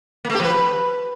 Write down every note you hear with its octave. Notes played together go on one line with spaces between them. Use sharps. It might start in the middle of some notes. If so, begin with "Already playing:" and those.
A#3
A3
G4
F3
B4